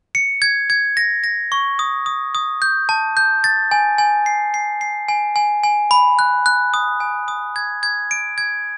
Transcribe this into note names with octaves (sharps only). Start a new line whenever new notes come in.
C#7
G#6
G#6
A#6
A#6
C#6
D#6
D#6
D#6
G6
A5
G6
A6
G#5
G#5
C7
C7
C7
G#5
G#5
G#5
B5
F#6
F#6
D#6
G#5
D#6
G#6
G#6
D7
G#6